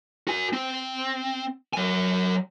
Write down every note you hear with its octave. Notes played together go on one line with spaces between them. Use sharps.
F#4 G#5
C4
F#3 G#5